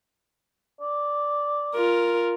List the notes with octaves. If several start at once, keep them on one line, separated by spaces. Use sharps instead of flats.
D5
F4 A#4